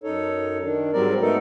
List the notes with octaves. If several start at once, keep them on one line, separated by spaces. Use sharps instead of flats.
F#2 D#4 A4 C#5
D#3 D4
G#2 F#3 G3 C4 A#4 D5
A3 B3 D#4 A4 A#4